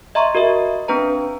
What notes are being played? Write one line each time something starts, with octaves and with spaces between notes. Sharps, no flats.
D#5 E5 A#5 C6 C#6
F#4 A#4 D#5 E5
C4 D4 B4 A#5